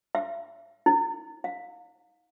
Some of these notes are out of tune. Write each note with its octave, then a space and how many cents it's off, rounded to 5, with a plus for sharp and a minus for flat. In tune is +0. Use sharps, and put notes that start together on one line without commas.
E5 +40
D#4 +40
F5 +30